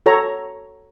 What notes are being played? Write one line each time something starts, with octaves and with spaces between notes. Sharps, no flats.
F#4 A4 C#5 A#5